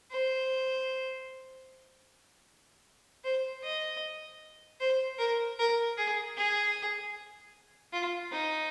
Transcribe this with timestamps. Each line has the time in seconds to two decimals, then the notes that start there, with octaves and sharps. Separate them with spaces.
0.11 C5
3.24 C5
3.64 D#5
4.81 C5
5.19 A#4
5.59 A#4
5.98 G#4
6.37 G#4
7.93 F4
8.32 D#4